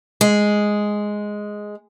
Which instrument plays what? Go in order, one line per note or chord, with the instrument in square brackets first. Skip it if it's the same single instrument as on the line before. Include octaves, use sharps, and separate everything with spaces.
[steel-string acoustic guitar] G#3